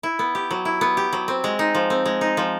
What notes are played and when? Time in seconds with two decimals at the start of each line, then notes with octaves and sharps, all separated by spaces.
0.03 E4
0.19 B3
0.35 G4
0.51 F#3
0.65 E4
0.81 B3
0.97 G4
1.13 F#3
1.28 C4
1.44 G#3
1.59 D#4
1.75 F3
1.90 C4
2.06 G#3
2.21 D#4
2.37 F3